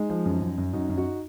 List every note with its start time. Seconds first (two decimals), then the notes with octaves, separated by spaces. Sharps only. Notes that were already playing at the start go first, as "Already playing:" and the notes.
Already playing: G#3 D#4
0.10 F3
0.26 F#2
0.41 F#2
0.58 F#2
0.73 F#2 D#4 F#4
0.89 F#2
0.97 D#4 F#4